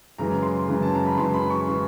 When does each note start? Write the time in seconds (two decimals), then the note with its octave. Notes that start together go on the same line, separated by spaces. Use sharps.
0.18 F#2 C#3 E3 G#3 A#5
0.43 C6
0.68 F#2 C#3 E3 G#3
0.82 A5
0.95 A#5
1.06 B5
1.18 F#2 C#3 E3 G#3 C6
1.34 B5
1.50 C#6
1.68 C#3 E3 G#3